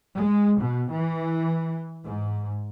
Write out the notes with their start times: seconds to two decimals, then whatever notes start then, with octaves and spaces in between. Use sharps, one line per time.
0.16 G#3
0.60 B2
0.92 E3
2.05 G#2